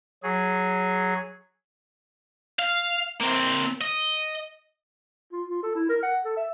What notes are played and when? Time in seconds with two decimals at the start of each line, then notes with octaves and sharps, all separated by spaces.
0.23 F#3 G#4
2.59 F5
3.21 A#3 C4
3.81 D#5
5.32 F4
5.49 F4
5.63 A4
5.75 E4
5.89 A#4
6.03 F#5
6.25 A4
6.37 E5